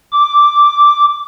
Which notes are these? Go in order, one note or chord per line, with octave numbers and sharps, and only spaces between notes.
D6